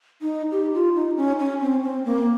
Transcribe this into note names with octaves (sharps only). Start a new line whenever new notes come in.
D#4
G4
F4
D#4
C#4
C#4
C4
C4
A#3